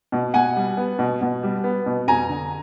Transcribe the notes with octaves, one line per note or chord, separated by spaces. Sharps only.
B2
B2 F#5 G#5
G3
B3
B2
B2
G3
B3
B2
F2 G#5 A#5
D3